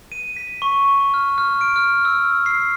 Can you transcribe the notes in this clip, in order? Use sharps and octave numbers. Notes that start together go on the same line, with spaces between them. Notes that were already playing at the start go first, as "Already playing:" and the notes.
D#7
B6
C#6
F6
F6
D7
F6
E6
C7